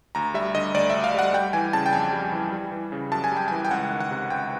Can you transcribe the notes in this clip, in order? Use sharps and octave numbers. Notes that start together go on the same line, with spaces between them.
D2 A#5
G3 E5
D3 D#5
D2 D5
D2 E5
F5
G3 F#5
G3 G5
E3 G#5
C#3 A5
G5
F2 G#5
G3
E3
G3
E3
C#3
F#2 A5
G#5
G3 G5
E3 G#5
G5
C#2 F#5
D#3
F#5
C3
C#2 G5